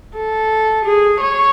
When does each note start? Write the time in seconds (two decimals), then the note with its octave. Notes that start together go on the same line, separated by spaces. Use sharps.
0.16 A4
0.85 G#4
1.21 C#5